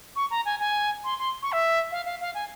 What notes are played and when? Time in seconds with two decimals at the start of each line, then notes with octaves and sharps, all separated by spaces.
0.16 C#6
0.30 A#5
0.45 G#5
0.59 G#5
1.04 C6
1.18 C6
1.42 C#6
1.52 E5
1.91 F5
2.05 F5
2.20 F5
2.34 G#5